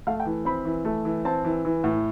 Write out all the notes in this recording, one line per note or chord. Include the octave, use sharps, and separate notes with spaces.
A3 F5
G5
E3
C4 B5
E3
A3
E3
C4 A5
E3
E3
A2